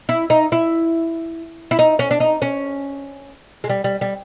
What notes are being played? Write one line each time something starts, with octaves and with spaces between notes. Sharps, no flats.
E4
D#4
E4
E4
D#4
C#4
D4
D#4
C#4
G#3
G3
G3
G3